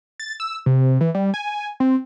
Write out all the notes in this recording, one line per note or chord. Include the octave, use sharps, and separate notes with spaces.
A6
E6
C3
E3
G3
G#5
C4